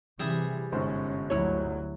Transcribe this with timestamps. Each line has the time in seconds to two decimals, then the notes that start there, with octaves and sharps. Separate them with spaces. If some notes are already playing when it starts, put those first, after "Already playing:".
0.19 C3 E3 G3 G#4 E5
0.72 G1 G#2 C#4 C5
1.30 D2 F#3 E4 C#5